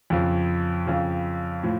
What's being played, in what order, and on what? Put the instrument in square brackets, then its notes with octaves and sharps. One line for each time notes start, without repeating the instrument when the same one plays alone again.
[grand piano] F2 C#3 F3
F2 C#3 F3
A2 F3